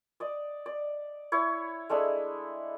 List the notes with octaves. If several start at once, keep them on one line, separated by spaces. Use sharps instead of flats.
D5 D#5
D5
E4 C#5
G#3 A3 D4 A4